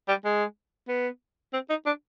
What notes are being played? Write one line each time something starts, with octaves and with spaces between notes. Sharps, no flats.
G3
G#3
B3
C4
D#4
D4